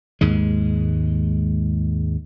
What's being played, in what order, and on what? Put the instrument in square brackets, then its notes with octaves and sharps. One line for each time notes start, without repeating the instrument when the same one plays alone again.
[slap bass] D#2 G#2 G#3